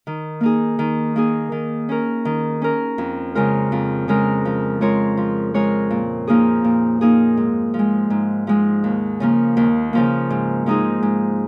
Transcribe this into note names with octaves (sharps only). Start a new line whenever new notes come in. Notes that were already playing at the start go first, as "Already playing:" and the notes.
D#3
A#3 D#4 G#4
D#3
A#3 D#4 G#4
D#3
C#4 A#4
D#3
C#4 A#4
F2
C#3 G#3 F4 A#4
F2
C#3 G#3 F4 A#4
F3
G#3 F4 A#4 C#5
F3
G#3 F4 A#4 C#5
A#2
F3 A#3 D#4 G#4
A#2
F3 A#3 D#4 G#4
G#2
F3
G#3
G#2
F3 G#3
D#2
C#3 F3 A#3
D#2
C#3 F3 A#3
G#2
F3 G#3 D#4 G#4
G#2